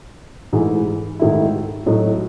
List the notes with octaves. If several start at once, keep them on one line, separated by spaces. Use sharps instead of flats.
G#2 E3 A3 E4 G#4
G#2 D#3 A3 E4
A2 F#3 A3 D#4